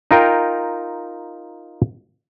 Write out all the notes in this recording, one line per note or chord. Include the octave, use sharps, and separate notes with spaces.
D#4 F4 A#4 G5